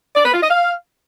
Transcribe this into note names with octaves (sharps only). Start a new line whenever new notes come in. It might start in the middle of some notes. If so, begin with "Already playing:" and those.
D5
B4
F4
D#5
F5